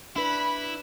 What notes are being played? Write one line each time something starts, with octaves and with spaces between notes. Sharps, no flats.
D4 E4 B4 B5